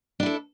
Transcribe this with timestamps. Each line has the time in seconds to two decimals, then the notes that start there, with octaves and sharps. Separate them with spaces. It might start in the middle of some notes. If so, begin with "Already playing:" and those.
0.20 D4
0.23 E4
0.26 A4